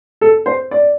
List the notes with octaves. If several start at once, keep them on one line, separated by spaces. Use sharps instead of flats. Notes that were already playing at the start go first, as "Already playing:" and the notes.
A4
C5
D5